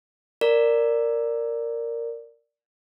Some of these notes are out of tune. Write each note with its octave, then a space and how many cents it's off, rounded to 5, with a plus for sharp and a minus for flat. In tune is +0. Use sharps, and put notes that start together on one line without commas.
A#4 -5 D5 +0